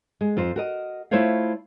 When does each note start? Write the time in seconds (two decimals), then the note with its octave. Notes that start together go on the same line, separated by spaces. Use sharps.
0.21 G#3
0.37 F2 F4 C5
0.56 F#4 A#4 D#5
1.11 A3 E4 F4 C5 C#5 F5